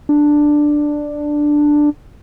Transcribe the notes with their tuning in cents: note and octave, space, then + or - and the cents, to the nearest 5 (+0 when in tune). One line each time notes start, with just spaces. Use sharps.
D4 +5